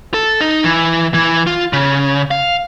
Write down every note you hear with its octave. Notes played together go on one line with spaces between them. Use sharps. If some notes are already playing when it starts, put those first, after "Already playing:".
A4
D#4
E3
E3
F4
C#3
F5